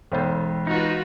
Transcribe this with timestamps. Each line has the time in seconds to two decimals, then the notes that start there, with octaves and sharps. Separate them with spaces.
0.12 B1 E3 G#3 C5
0.67 D#4 F4 F#4 B4